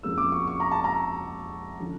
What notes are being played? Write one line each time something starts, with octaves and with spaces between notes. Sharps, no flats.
F2 C#3 F3 A#3 C#4 E6
D6
C#6
C#6
A#5
A5
A#5
D3 F3 C#4